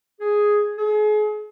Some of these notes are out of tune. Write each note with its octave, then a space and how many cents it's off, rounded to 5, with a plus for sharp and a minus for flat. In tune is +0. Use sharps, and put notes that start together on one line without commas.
G#4 +0
G#4 +35